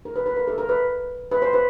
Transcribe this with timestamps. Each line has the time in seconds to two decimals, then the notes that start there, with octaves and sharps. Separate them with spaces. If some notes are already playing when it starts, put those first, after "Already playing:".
0.05 A#4
0.16 B4
0.26 B4
0.36 A#4
0.48 A4
0.58 A#4
0.69 B4
1.32 B4
1.42 C5
1.53 B4